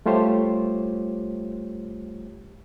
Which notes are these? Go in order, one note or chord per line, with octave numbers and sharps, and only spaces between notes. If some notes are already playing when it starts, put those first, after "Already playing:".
G3 A3 F4 G4 C5 C#5